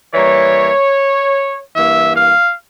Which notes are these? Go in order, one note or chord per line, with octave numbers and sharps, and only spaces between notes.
E3 G3 A#3 C#5
G2 E3 A#3 E5
F5